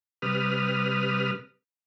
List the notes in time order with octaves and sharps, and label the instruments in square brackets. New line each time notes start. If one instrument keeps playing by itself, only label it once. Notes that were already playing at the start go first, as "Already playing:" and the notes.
[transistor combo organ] C3 G3 B4 D#6 F6